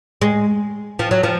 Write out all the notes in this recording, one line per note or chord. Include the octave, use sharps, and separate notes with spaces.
G#3
F3
F#3
F3